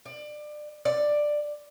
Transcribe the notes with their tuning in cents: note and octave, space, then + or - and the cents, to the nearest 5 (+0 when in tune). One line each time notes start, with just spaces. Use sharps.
D5 +25
D5 +10